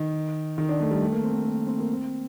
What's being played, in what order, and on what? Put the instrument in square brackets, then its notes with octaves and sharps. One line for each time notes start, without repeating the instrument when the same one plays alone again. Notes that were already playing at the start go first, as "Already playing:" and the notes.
Already playing: [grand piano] D#3
D#3
D4
A3
G3
A3
A#3
C4
A#3
A#3
C4
A#3
C4